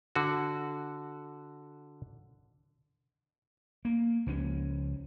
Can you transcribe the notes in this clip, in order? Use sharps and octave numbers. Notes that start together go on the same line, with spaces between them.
D3 F#4
A#3
C#2 F3 G#3 C#4